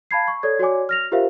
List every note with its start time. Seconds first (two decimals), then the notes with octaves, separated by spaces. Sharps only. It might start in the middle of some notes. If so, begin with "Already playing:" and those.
0.11 F5 A5 B5 G#6 C7
0.28 C#6
0.43 A4 C#5 D5 G#6
0.59 F#4 C#5 D5 G#5 D6
0.89 F6 A#6 F7
1.12 F4 G4 A#4 C5 E5 F5